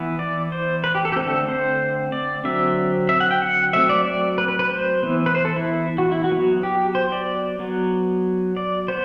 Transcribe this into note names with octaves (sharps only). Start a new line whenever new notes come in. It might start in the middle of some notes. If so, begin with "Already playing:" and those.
Already playing: E3 B3
D5
C5
B4
G4
A4
G4
D3 A3 C4 A4
C5
D5
D3 F#3 C4 E5
E5
F#5
G5
F#5
F#3 A3 C4 E5
D5
D5
B4
B4
B4
C5
E3 B3
B4
C5
A4
E4
F#4
E4
F#4
F#3 B3
G4
C5
D5
F#3 B3
D5
B3 C5